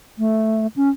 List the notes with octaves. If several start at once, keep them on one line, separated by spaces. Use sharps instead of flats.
A3
C#4